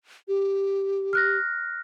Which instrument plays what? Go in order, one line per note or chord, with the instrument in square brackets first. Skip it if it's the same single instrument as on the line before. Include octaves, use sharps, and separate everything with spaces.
[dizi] G4
[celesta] F6 F#6 A#6